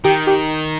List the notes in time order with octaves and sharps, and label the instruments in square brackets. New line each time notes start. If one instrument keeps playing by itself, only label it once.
[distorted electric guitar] D#3 [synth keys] G4 G5
[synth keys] G4 G5